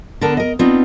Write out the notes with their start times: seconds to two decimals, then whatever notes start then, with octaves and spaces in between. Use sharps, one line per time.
0.21 D3 B3 A4 A#4 A5
0.37 A#4 D#5
0.59 B3 C4 D4 D#4 F4